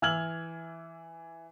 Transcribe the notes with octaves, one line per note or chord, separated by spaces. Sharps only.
E3 E6 F6 G#6 F#7